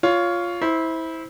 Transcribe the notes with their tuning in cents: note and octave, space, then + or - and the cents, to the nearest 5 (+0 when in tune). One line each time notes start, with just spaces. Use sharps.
F4 +0 C#5 +15
E4 -20 C5 +0